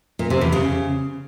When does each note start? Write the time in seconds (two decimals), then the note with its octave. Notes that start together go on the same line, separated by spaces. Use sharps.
0.19 A#2
0.30 C3
0.41 E2
0.52 C#3